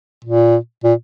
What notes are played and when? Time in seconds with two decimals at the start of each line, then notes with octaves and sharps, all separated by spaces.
0.24 A#2
0.83 A#2